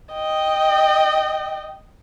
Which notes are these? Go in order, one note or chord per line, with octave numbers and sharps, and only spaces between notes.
D#5 G5